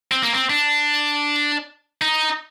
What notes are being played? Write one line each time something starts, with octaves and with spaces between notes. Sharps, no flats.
C4
A#3
C4
D4
D#4